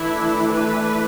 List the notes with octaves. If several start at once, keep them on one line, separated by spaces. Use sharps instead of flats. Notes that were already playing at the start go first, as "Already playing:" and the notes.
Already playing: E3 A3 D4 E4
B4